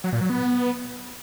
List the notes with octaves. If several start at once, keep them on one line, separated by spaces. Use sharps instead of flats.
F#3
A#2
F#3
B3